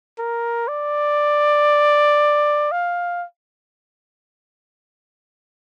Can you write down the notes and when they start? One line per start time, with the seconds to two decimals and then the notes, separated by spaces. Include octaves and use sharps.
0.18 A#4
0.68 D5
2.72 F5